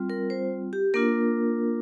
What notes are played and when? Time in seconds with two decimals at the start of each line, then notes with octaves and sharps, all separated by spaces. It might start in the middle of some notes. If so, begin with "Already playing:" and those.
Already playing: G3 C4 F4
0.10 A#4
0.30 C5
0.73 G4
0.94 A#3 D4 F4 A#4